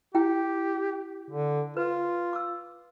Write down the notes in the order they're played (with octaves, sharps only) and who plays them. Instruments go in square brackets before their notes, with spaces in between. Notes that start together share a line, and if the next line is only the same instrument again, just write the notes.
[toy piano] E4 G5 [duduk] G4
[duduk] D3
[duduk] F4 [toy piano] B4
[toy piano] D6 E6